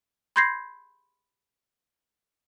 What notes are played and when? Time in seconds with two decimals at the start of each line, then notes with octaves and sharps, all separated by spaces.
0.36 B5 C6 G6 G#6 A#6 C7